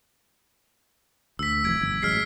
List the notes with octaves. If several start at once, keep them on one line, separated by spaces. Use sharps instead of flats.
D2 E6 B6
F1 C3 E3 G#6 D7
G1
A1 F#3 G#3 F6 B6 C7